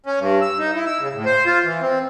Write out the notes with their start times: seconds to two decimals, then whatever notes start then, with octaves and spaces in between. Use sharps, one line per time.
0.06 C#4
0.19 G2
0.42 E6
0.59 D#4
0.75 E4
0.86 E6
1.00 C#3
1.14 A2
1.25 C5
1.46 F4
1.64 E3
1.81 C4